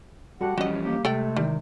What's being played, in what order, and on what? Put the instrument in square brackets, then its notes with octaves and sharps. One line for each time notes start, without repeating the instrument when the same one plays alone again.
[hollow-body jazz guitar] G3 F#4 A4 [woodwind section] G4 F#5
[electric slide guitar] E3 F3 C#4 [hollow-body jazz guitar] G3 [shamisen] F#4 D#5
[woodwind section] A#3 G4
[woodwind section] C3 G#3 [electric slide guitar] A3 [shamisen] A4 D5 G5
[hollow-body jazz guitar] D#3 E3 A#4 [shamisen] G3